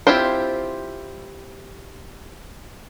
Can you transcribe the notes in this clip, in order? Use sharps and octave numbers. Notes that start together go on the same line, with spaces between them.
C4 E4 F4 G4 C5